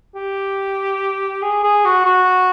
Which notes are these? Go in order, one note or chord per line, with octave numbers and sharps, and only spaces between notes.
G4
G#4
G#4
F#4
F#4